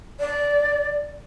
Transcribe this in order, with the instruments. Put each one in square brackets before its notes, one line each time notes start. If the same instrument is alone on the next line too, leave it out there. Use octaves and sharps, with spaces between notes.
[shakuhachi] D5